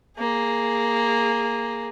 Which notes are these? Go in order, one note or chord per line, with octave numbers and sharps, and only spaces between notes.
A#3 G#4